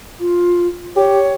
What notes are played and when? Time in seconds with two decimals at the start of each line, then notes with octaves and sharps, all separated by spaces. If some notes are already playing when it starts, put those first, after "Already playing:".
0.20 F4
0.96 G4 C#5